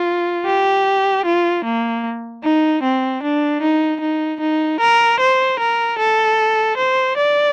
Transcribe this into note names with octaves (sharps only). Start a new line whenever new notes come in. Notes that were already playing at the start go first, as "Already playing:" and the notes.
Already playing: F4
G4
F4
A#3
D#4
C4
D4
D#4
D#4
D#4
A#4
C5
A#4
A4
C5
D5